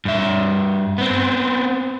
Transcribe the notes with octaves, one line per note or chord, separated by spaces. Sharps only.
G2 E5
B3 C4